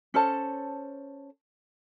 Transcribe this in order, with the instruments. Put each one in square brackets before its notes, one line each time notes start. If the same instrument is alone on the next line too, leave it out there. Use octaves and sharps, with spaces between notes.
[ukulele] C#4 A4 C5 A5